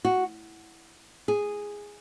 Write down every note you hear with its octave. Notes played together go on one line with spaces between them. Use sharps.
F#4
G#4